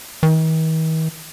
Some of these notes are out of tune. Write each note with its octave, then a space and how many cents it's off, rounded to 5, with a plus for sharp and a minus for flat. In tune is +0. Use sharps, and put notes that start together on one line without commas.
D#3 +45